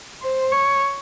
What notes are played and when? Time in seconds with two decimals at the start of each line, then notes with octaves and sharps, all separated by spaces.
0.22 C5
0.52 C#5